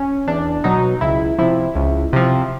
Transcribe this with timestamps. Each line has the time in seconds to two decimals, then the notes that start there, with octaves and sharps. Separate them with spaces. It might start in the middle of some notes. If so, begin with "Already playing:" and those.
Already playing: C#4
0.28 E2 D4
0.64 B2 F#3 D#4
1.01 C#2 E4
1.38 C3 F3 E4
1.75 C#2
2.13 C3 F3